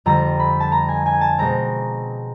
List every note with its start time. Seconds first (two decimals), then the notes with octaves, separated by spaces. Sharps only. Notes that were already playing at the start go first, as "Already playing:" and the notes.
0.06 F2 D3 G3 A#5
0.40 B5
0.60 A5
0.72 A#5
0.89 G#5
1.06 G#5
1.21 A5
1.39 B2 G#3 C4 A#5